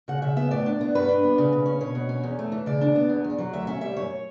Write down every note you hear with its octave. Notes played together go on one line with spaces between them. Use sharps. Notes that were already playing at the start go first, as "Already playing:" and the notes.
C#3 F#5
C#3 E5
B3 E5
A2 D5
D4
B3
G2 B4
D4
B3
C#3
C#3
C#4
B2 C#5
B2
C#4
E2
A3
E3
C#3 D5
D4
B3
E2
E2
F#3
D2 E5
C#4 E5
G3 E5
F#2 C#5